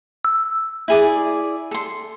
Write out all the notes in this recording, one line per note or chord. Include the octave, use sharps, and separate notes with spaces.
E6
E4 G#4 D5
A4 C6